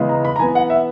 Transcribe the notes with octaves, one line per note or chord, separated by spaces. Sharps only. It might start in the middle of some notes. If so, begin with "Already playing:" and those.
Already playing: C#3 E3 G#3 B3
A#5
B5
A#5
E3 B3 G#5
F#5
E5